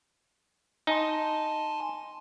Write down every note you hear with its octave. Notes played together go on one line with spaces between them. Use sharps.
D#4 G#5 A5 C6